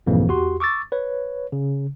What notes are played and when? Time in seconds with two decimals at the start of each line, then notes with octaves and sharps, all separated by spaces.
0.06 B1 F2 G#2 B2 E3 A#3
0.28 E2 F#4 G4 C6
0.60 C#6 D6 E6 A6
0.92 B4 C#5
1.52 C#3